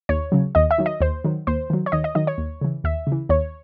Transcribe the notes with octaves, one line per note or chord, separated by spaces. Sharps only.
D#2 C#5
C#3 F#3
D#2 D#5
E5
D#3 F#3
D#5
D#2 C5
D#3 F#3
D#2 C5
D#3 F#3
C#5
D#2 D#5
D#5
D#3 F#3 D#5
C#5
D#2
C#3 E3
D#2 E5
C#3 E3
D#2 C#5